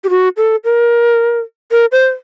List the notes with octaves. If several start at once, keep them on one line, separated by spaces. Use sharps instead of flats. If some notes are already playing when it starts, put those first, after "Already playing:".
G4
F#4
A4
A#4
A#4
C5